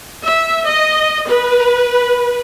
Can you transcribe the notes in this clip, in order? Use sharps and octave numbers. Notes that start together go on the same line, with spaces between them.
E5
D#5
B4